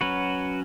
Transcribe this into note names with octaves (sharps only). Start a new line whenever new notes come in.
F#3 C#4 F#4 B4